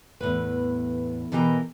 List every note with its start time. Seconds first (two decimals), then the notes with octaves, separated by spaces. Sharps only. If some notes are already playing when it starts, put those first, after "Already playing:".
0.21 E2 A2 B4
1.32 B2 E3 G4 A#4 A#5